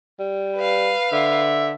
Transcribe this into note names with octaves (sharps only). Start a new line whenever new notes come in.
G3
B4 F5
D3 E5